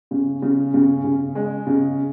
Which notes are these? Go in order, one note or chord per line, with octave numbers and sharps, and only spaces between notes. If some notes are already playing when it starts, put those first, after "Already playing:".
C#3
C#3
C#3
C#3
G#3
C#3